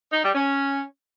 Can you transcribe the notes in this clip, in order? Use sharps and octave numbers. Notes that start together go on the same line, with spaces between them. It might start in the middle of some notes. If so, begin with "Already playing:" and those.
D#4
G3
C#4